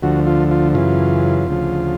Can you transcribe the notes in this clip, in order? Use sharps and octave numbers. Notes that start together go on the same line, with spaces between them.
D2 D3 F3 F#4
F4
F4
F#2 C#3 E3 F4
D2 C#3 F3